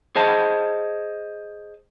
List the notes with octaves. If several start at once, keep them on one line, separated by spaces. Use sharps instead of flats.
G#4 C5 D#5 A5